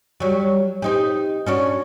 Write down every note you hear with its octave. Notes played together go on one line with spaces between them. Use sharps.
F#3 G3
C4 D#4 G4
C#4 D4 F#4